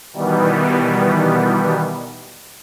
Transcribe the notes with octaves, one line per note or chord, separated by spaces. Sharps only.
B2 D#3 E3 G3 B3